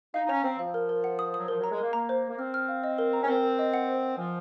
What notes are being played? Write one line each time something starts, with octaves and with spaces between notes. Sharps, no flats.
D#4 F5
D#4
C#4 A#5
C4 A#5
F3 F5
A#4
A#4
F#5
D#6
D#6
F#3
F3 A#4
F#3 A#5
G#3
A#3 A#4
A#3 A#5
C5
C5
A#3
C4 F6
F6
F5
D#5
A#4
A#5
C#4
C4 A#4
A#4
D#5
F#5
C5
F#5
F3 G#5